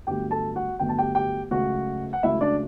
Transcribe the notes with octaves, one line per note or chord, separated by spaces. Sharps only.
G1 G2 D3 F#3 A3 G4 G5
A4 A5
F#4 F#5
G1 G2 D3 F#3 A3 G5
A5
G4 G5
G4 G5
C#2 C#3 F#3 A3 F#4 F#5
F#5
C#2 C#3 F#3 A3 E4 E5
D4 D5